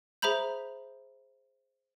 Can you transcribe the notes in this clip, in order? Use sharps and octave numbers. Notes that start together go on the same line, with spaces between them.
G#4 C5 E5 A#5 B5 G6